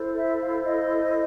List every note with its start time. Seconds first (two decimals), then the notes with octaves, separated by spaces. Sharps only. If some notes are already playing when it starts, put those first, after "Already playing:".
Already playing: E4 A4 C5
0.15 E5
0.40 F5
0.64 D#5